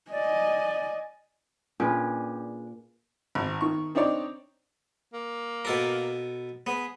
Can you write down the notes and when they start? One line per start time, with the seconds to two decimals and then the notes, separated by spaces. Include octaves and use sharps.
0.11 D5 D#5 G#5
1.80 A#2 C#4 D4 G#4 B4
3.35 G#1
3.61 D#3 C#6
3.95 C4 D4 D#4 C#5 D5
5.14 A#3
5.65 B2 A4 A#4
6.67 B3 G#4